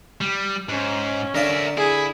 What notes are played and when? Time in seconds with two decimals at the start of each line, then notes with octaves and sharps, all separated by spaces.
0.21 G3
0.69 G#2 C#4
1.35 D3 A#4 D5 E5 F5
1.77 E4 G#4